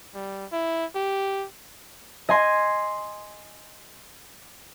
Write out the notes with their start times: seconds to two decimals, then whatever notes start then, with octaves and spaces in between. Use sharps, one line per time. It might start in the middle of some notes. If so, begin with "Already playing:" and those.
0.14 G3
0.52 E4
0.95 G4
2.29 D#5 G#5 C6